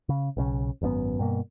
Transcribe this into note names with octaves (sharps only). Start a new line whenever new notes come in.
C#3
B1 C#3 C#4
G#1 F#2 D#3 B3
G2 B2 A#3